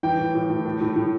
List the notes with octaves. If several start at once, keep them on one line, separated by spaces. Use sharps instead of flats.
E3 G5
A2
A2
A2
A2
A2
A2